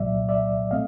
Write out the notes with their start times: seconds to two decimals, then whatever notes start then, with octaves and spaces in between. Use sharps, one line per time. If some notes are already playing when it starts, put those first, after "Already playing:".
Already playing: C2 A#2 F#3 D5 E5
0.29 D5 E5
0.71 A3 C4 D#5 F5